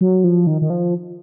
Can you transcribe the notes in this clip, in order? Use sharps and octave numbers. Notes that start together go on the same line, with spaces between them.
F#3
F3
D#3
D#3
F3